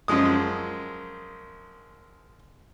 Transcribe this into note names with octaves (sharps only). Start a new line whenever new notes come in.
F#2 F3 G#3 D#6